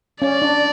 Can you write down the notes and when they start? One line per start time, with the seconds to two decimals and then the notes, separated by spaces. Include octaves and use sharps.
0.22 C#4 D5
0.42 D4